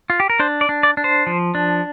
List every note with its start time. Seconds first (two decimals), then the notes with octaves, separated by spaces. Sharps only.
0.10 F4
0.20 G4
0.30 A#4
0.40 D4 C5
0.61 D5
0.69 D4
0.83 D5
0.97 D4
1.04 C5
1.27 F3
1.55 D4